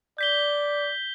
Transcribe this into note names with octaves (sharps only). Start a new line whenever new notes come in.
D5 G6 B6 G7